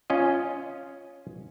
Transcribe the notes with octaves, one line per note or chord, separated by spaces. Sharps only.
C#4 F4 D#5